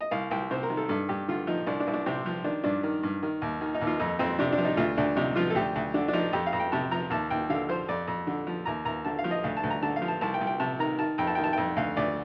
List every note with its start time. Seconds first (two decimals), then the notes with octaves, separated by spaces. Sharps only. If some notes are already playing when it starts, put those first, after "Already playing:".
0.01 D#5
0.11 C2 F5
0.31 C2 G5
0.51 C3 C5
0.63 A#4
0.69 D#3
0.77 A4
0.89 G2 A4
1.09 G2 G4
1.28 D3 F4
1.47 F3 D#4
1.67 C2 D4
1.80 D4
1.87 C2
1.94 D4
2.06 C3 C4
2.26 F3
2.44 D#3 D4
2.64 G2 D4
2.83 D#3
3.03 G2
3.23 D#3
3.42 D#2
3.61 D#3
3.74 D#4
3.81 D#2
3.87 F4
4.00 F2 D#4
4.19 F2 C4
4.39 C3 D4
4.53 D4
4.58 F3
4.65 D#4
4.77 D2 F4
4.97 D2 D4
5.16 C3 D#4
5.36 F3 F4
5.50 A4
5.55 D2 G4
5.75 D2
5.94 D3 D4
6.08 D4
6.13 F3 D#4
6.33 F2 G4
6.46 F5
6.53 F2
6.60 G5
6.72 C3 A5
6.91 F3 A#5
7.10 D#2 A5
7.30 D#2 G5
7.49 D3 F5
7.69 F3 C5
7.88 F2 D5
8.07 F2
8.27 D3
8.47 F3
8.66 D#2 A#5
8.85 D#2 A#5
9.05 D3 A5
9.18 F5
9.24 F3
9.31 D#5
9.44 D2 F5
9.57 A5
9.63 D2
9.70 A#5
9.82 D3 A5
9.96 F5
10.02 F3
10.08 A5
10.21 C2 A5
10.34 G5
10.41 C2
10.47 G5
10.60 C3 A5
10.79 D#3 A#5
10.99 D#3 A5
11.18 F2 G5
11.27 A5
11.35 D#3 G5
11.44 A5
11.53 F2 G5
11.76 D2 F5
11.97 D2 D5